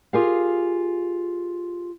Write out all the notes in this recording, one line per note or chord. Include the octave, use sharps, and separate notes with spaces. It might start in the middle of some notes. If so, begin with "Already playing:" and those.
F4 G4 G#4 A#4 F5